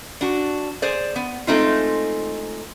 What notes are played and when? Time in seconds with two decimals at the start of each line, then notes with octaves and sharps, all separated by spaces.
0.21 D4 F#4
0.82 G#4 C5 D5
1.16 B3
1.47 G#3 A3 C4 D#4 F4